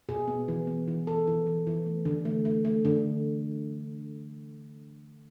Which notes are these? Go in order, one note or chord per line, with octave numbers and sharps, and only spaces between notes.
B2 G#4
B3
E3
B3
E3
E3 A4
E3
E3
E3
A3
D3
A3
A3
A3
D3